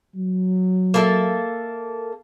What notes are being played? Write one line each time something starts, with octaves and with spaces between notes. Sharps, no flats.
F#3
A#3 A4 E5